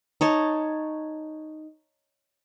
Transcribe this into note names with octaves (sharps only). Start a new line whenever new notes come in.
D#4 C#5 A5